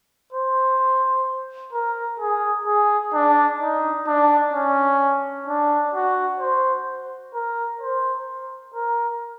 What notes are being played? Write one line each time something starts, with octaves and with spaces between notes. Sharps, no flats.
C5
A#4
G#4
G#4
D4
D#4
D4
C#4
D4
F#4
C5
A#4
C5
A#4